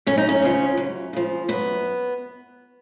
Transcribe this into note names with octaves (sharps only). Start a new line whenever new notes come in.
F#2 C#4
D#4
C#4
C#3 F3
F#2
C#3 F3
F#2 B3